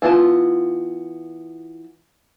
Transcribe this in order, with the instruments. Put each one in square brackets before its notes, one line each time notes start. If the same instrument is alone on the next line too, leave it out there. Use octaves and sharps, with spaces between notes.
[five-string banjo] E3 B3 F4 A5